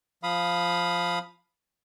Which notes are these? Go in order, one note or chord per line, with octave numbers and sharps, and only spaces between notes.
F3 F5 B5 D#6